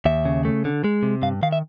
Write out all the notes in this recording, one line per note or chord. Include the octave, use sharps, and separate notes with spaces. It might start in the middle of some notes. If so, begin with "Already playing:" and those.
D#2 E5
C#3
A3
D3
G#3
C3
G2 F5
D#3 F5
E5